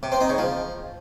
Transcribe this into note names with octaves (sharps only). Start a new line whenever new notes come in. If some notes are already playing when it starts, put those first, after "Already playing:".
C3
C4
D#4
C#3
F3